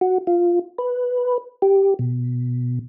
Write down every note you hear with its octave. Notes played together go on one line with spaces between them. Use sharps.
F#4
F4
B4
G4
B2